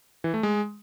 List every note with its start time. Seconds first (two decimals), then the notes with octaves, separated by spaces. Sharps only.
0.24 E3
0.34 A3
0.43 G#3